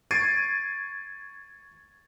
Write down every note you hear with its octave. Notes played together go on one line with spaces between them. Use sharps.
C#6 G#6 A6 C7 D7 D#7